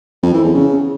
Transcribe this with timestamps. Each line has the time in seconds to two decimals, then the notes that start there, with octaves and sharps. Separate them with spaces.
0.23 F2
0.33 E3
0.44 E2
0.54 C#3